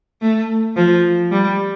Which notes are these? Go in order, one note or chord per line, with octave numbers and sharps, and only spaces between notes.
A3
F3
G3